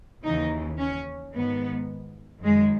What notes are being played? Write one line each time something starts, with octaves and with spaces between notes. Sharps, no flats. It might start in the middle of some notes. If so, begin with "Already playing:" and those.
D#2 C#3 E3 D#4
C#4
G#2 D#3 B3
F#2 D#3 G#3